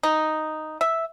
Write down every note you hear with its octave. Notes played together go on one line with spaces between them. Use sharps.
D#4
E5